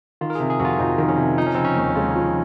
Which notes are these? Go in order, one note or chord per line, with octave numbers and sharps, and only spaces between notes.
D#3 F4
A#4
C3 G#4
G#4
F2 F#4
F4
F2 D#4
D#3
C#4
C3
F3 D#4
C#4
C#3 C4
C#4
D#2
G#3 F4
F3